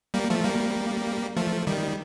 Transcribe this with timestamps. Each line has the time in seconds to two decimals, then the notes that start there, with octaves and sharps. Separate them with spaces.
0.14 G3 A#3
0.30 F3 A3
0.44 G3 A#3
1.37 F3 A3
1.67 D#3 G3